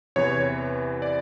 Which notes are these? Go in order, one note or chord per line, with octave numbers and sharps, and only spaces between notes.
E2 C3 E3 C#5
D5